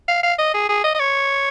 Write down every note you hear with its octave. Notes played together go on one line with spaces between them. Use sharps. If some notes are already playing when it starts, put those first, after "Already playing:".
F5
F5
D#5
G#4
G#4
D#5
D#5
C#5